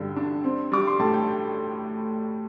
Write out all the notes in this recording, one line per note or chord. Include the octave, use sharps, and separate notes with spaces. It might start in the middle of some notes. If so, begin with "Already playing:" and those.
Already playing: G2 D3 G5
D4
C4
G3 D6
C6
A2 A5
G5